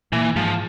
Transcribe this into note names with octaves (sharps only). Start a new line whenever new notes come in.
A#2 E3 A#3
G#2 F3 G#3